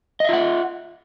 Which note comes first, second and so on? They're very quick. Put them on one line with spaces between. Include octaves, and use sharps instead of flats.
D#5 E5 F4 F#5